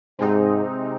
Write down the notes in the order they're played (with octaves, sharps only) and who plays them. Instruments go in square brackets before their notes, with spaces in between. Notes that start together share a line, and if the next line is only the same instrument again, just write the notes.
[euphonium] G#2 [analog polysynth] C3 G#3 C4 D#4